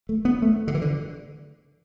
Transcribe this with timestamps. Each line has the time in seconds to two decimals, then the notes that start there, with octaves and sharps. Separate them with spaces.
0.09 A3
0.25 B3
0.42 A3
0.68 D3
0.74 E3
0.82 D3